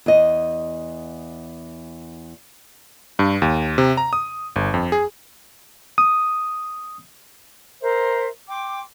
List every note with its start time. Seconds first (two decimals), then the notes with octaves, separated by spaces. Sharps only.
0.06 E2 D#5
3.19 G2
3.42 D#2
3.78 C3
3.97 A#5
4.13 D#6
4.56 G1
4.74 F2
4.92 G#4
5.98 D#6
7.80 A#4 C5 E5
8.48 G5 C6 D6